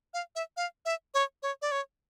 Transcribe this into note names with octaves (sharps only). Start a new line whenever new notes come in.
F5
E5
F5
E5
C#5
C#5
D5
C#5